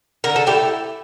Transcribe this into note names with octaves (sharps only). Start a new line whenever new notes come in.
D3 A#4
A4
A3 E4 G4